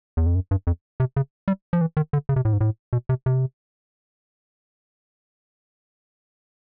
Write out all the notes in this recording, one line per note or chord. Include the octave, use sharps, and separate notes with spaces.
E2
F2
F#2
G2
F2
C3
C#3
G3
F3
E3
D#3
D3
C#3
C3
A2
G#2
A2
B2
C3
C3